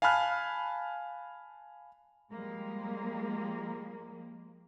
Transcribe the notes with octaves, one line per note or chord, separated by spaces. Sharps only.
F5 G#5 A5 B5 F6 F#6
F3 G3 G#3 A#3